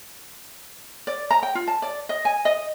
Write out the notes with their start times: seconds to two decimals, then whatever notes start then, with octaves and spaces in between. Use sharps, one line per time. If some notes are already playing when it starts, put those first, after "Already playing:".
1.07 D5
1.30 A#5
1.43 G5
1.55 F4
1.67 A5
1.82 D5
2.09 D#5
2.25 G#5
2.45 D#5